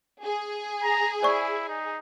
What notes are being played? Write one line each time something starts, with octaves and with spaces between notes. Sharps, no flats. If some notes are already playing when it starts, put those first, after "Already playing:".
G#4
A#5
E4 C5 D5 C#6
D#4